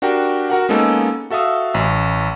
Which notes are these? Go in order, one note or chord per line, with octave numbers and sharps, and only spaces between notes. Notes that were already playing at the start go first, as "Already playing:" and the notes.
D4 F#4 G4 A#4 G5
F#4 A#4 F#5
G#3 A#3 B3 C#4 D#4 A4
F#4 A4 E5 F5 D#6
A1